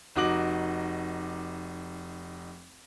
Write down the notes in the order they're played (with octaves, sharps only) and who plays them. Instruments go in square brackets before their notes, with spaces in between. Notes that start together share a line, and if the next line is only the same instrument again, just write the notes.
[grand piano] F1 D#4 F#4 D6 F#7